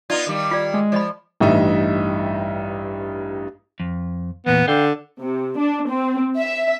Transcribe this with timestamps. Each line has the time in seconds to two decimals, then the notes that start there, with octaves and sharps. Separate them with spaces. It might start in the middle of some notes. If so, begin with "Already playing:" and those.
0.10 B3 D#4 F4 D5
0.27 D#3 G3
0.51 F4 D5
0.74 G#3
0.92 F3 D5 D#5 B5
1.40 A1 G2 D#4 E5
3.80 F2
4.46 E2 A#2 E3 B3
4.68 D3 F5 G5
5.22 C3
5.58 D4
5.88 C4
6.39 E5